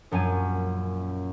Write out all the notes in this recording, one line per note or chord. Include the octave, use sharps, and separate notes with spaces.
A#1 F#2 C#4 G#5 D#7